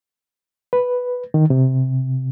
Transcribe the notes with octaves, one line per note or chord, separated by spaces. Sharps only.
B4
D#3
C3